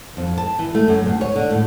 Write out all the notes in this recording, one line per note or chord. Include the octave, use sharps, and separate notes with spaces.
F2
A5
E3
A3
F#2
D2
C#5
D3
A2